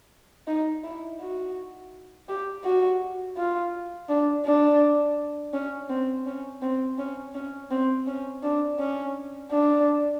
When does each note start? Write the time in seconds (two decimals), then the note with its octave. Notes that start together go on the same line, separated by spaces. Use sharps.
0.47 D#4
0.84 E4
1.20 F#4
2.29 G4
2.64 F#4
3.37 F4
4.09 D4
4.45 D4
5.53 C#4
5.89 C4
6.26 C#4
6.62 C4
6.98 C#4
7.34 C#4
7.71 C4
8.07 C#4
8.43 D4
8.79 C#4
9.51 D4